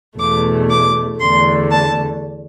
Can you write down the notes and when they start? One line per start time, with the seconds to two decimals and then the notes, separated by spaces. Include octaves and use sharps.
0.19 E2 B2 A3 D6
0.70 D6
1.20 E2 D3 A3 C6
1.71 A5